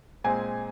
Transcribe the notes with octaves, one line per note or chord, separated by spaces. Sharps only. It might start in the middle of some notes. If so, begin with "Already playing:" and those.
A#2 G#3 C4 G#5